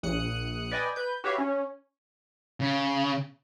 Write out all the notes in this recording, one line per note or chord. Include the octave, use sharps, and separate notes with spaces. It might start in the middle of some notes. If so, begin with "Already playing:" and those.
A#1 D#6 F#6 C#7
B4 D5 D#5 G5 G#5
B4 G6
F#4 G4 B4 C#5 E5 F5
C#4
C#3